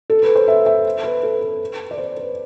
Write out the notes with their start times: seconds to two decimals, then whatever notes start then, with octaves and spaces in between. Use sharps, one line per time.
0.10 A4
0.23 B4
0.36 C5
0.48 E5
0.66 E5
1.04 B4
1.23 A4
1.41 B4
1.91 D5
1.98 C5
2.17 B4